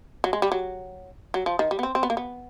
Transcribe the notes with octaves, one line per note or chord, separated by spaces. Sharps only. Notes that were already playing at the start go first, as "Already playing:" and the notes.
F#3
G#3
G3
F#3
F#3
F3
D#3
G3
B3
C4
C4
B3
A#3
B3